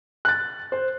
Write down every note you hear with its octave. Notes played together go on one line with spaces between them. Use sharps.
F#6 A6
C5